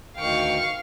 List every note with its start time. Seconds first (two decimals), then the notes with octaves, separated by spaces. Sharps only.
0.17 D2 D#3 F5 G5 C#6